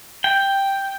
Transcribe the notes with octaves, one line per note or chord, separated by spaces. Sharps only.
G5